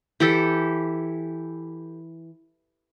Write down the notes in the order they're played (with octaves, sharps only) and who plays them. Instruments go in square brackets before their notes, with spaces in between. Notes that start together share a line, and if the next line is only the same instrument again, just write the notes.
[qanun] E3 G4 A4